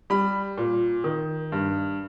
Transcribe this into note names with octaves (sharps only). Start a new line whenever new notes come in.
G3 B5
A#2
D#3
G2